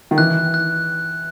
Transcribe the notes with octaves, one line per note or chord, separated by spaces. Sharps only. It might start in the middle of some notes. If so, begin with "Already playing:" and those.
D#3
E3 F#6
F#6